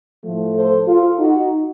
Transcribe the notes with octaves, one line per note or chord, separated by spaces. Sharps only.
A2 F3 A3
A4 C5
F4 A4
D#4 F#4